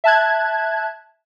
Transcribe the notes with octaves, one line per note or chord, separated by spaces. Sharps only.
E5 A5 F#6 G#6